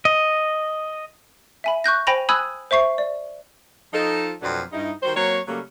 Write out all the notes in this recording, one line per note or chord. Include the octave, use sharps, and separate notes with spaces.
D#5
E5 G#5 B5
C#6 F#6 G6 A#6
C5 G5 G#5 B5 A#6 F7
G#5 B5 D#6 E6 F#6 G#6
C5 E5 C#6 C7
D5
F3 D#4 A4
F2 B2 F#3 A3 D4
G2 D#4 E4
D#3 G3 F#4 C5
F#3 A#3 C4 C#5
C#3 F#3 G3 A3 A#3 C#4